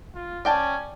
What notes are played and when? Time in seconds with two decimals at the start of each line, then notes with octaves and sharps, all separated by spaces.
0.15 F4
0.45 C#4 D5 G5 A5